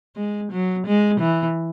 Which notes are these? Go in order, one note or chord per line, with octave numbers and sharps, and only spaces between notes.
G#3
F#3
G#3
E3